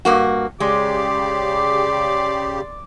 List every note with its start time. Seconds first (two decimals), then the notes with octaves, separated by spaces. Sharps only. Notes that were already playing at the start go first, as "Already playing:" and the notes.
0.05 G2 A#3 F#4
0.60 C#3 G#3 G4 D5 C6 D6